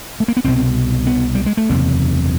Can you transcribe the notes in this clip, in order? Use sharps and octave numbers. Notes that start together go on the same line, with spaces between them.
A3
A#3
B3
C2 B2 C4
B3
G3
G#3
A3
F#1 E2 C3 A#3